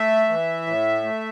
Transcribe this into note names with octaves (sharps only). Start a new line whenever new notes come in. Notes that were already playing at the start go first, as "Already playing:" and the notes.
Already playing: A3 E5
E3
A2
A3